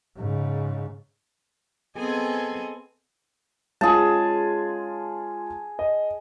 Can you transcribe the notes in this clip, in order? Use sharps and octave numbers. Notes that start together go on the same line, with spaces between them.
G#2 C#3
B3 C4 G#4 A4 D#5 G#5
G#3 C#4 F4 G#4 A5
D#5